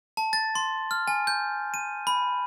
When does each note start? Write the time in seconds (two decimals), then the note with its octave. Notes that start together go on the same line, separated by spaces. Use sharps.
0.17 A5
0.33 A6
0.55 C6
0.91 F6
1.08 G#5
1.27 G6
1.74 D#7
2.07 B5